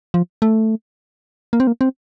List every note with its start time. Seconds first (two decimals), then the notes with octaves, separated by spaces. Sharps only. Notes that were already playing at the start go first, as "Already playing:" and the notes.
0.14 F3
0.42 A3
1.53 A#3
1.60 C4
1.67 A#3
1.81 C4